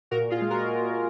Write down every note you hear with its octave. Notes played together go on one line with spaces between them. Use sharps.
A#2 F#4 A#4
F4 G#4
G#3
F#4 A#4